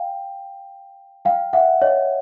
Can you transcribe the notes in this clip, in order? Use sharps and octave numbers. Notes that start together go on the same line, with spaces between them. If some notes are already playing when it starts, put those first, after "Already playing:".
Already playing: F5 G5
F5 G5
E5 F#5
C#5 D#5